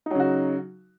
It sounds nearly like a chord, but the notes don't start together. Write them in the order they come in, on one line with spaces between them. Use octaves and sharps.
D#4 F#3 C#3 F#4